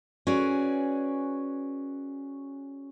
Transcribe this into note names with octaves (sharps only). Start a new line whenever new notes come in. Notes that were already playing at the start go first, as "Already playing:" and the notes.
C#4 F#4 G#4 B4 D5